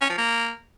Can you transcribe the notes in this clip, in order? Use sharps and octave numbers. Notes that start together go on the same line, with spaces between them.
C#4
F3
A#3